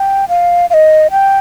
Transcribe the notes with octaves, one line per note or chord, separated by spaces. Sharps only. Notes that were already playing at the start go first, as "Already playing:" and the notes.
Already playing: G5
F5
F5
D#5
G5